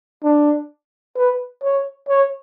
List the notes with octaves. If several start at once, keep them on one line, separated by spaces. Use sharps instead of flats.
D4
B4
C#5
C#5